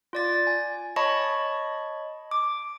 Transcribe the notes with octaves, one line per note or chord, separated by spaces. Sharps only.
F4 D5 A6
G#5
C#5 D#5 A5 B5 C#6
D6